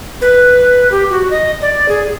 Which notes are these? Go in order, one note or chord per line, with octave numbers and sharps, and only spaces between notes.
B4
G4
F#4
D#5
D5
G#4